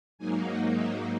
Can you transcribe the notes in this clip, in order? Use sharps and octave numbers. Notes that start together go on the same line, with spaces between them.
G#2 F#3 A#3 D#4 G#5
F#5
E5